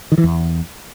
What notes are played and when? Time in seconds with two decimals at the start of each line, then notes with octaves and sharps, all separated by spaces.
0.12 D#3
0.18 E3
0.24 E2